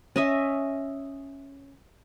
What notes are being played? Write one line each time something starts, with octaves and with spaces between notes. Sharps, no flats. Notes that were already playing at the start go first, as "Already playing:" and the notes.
C#4 D#5 E5